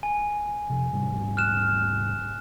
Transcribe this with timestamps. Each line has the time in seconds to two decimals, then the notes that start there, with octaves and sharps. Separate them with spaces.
0.03 G#5
0.70 C3 F3
0.92 D#1 G#2 G3
1.37 F6 F#6 E7